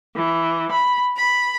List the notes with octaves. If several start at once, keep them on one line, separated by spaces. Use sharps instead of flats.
E3
B5
B5